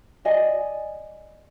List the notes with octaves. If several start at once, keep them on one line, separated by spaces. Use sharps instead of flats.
D5 D#5 G#5